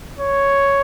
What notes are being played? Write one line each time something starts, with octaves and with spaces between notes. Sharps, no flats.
C#5